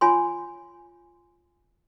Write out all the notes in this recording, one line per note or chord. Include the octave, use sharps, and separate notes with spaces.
F4 C#5 G#5 B5 C6